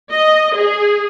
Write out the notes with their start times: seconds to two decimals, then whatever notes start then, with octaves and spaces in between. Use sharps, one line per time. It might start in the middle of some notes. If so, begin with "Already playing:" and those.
0.11 D#5
0.55 G#4